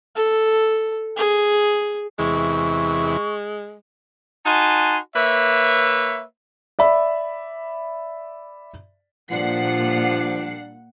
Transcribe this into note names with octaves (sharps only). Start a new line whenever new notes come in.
A4
G#4
E2 C3 E3 G#3 C#6
D#4 F#4 G#5 A5 C6
A#3 B4 C#5 E5
D5 E5 B5
A#2 F3 G3 D4 F#5 C7